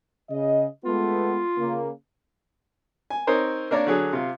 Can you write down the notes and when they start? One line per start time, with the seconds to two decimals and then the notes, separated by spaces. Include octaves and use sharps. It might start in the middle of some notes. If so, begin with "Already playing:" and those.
0.30 C#3 D#5
0.85 G#3 A3 B3 F4
1.57 C#3 A#3
3.10 G#5
3.27 C4 D#4 A#4 C5 C#5
3.71 A#3 D4 A#4 C#5 D5
3.87 D3 F#3 G#4
4.13 C3 F4